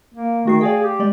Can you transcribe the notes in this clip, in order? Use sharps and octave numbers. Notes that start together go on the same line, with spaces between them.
A#3
D#3 A3 F#4 C7
G#4 D5 F5 G5
G4
G#3 D5 D#5